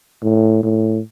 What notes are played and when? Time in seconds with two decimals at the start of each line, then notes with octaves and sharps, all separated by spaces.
0.22 A2
0.63 A2